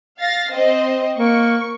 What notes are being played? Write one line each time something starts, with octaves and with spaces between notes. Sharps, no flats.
F5 A6 A#6
C4 C5 D#5
A#3 C#6